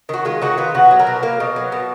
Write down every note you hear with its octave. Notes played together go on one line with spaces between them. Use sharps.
D#3 F#4
G#3 F4
D#3 F#4
B3 F4
B2 F#4
F#3
A#4
B2
A#3 F5
B2
F#3
B2